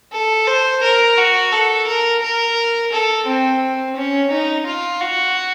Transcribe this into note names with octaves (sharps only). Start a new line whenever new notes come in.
A4
C5
A#4
F#4
A4
A#4
A#4
A4
C4
C#4
D#4
F4
F#4